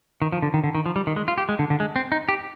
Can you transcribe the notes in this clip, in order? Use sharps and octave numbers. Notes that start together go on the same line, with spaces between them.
D#3
F3
D3
D#3
D3
D#3
F3
G3
D#3
G#3
F4
G4
G#3
D3
D3
G#3
C4
D#4
G4